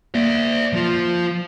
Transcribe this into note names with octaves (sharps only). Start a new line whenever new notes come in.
A#3 D5 E5
F3 F4